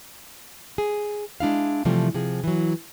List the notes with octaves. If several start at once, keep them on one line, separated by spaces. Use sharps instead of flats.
G#4
G#3 D4 E4 F5
C3 E3 F3 G3 A3
C3 F3 G#4
E3 F#3